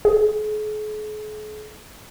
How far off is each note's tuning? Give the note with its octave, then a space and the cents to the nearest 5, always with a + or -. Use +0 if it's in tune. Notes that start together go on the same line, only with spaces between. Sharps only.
G#4 +45